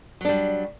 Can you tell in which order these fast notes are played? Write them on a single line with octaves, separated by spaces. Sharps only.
F#3 D4 G3